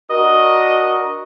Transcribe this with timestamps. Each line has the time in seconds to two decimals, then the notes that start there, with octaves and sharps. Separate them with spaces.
0.10 D4 F#4 A#4 D#5